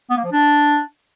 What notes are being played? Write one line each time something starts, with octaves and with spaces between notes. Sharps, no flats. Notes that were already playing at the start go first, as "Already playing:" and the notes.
B3
A#3
F3
D4